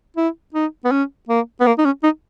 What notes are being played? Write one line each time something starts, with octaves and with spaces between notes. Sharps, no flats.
E4
D#4
B3
C#4
A#3
B3
A#3
D#4
C#4
D#4